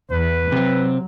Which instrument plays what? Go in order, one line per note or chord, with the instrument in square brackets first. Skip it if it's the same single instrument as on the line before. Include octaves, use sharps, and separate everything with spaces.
[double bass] E2 [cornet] B4
[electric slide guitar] C3 C4 [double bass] F#3